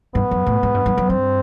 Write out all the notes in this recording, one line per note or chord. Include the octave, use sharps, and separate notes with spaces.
G2 B3
F#2
A2
G#2
G2
G2
F#2
G2 C4